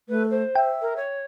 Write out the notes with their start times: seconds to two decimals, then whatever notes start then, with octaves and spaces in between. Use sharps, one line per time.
0.09 A3 B4
0.30 C5
0.55 E5 G5
0.81 A#4
0.96 C#5